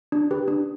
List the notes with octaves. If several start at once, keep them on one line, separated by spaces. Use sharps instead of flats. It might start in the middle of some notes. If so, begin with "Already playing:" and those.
D4
G4 B4
D4